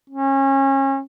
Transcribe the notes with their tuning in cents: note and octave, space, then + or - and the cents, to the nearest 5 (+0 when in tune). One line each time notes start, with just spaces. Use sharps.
C#4 -30